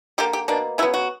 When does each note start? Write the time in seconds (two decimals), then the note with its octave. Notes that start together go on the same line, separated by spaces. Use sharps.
0.18 D3 A#3 G4
0.33 G4
0.48 B2 A#3 D4
0.78 C#3 F#3 B3 E4
0.94 F#4